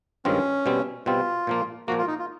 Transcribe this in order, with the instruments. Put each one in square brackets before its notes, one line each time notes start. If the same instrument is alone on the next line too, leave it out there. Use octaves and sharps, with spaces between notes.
[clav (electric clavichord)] G2 D#3 G#3 C4 F4 [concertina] C#4
[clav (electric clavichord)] B2 G3 C4
[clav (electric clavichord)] B2 G3 C4 [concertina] F4
[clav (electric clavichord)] A#2 F3 A#3
[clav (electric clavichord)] A#2 F3 A#3 [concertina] F#4
[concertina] F4
D#4
F4